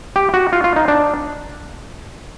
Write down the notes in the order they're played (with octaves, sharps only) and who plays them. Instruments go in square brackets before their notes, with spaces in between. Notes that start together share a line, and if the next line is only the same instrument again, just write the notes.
[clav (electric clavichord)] G4
F#4
F4
F4
D#4
D4